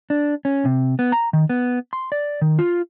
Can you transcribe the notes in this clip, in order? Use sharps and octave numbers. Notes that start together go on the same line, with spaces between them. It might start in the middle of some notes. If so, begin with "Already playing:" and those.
D4
C#4
C3
B3
A#5
D#3
B3
C6
D5
D#3
F4